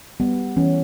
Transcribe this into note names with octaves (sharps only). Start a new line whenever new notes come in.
G3 B3
E3 C#4